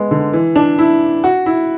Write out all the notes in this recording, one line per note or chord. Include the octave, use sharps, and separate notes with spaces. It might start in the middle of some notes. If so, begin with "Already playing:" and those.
Already playing: G#3 B3
D3
E3
D4
E4
F#4
E4